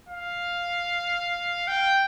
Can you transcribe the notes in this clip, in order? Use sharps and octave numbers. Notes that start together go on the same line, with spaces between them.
F5
G5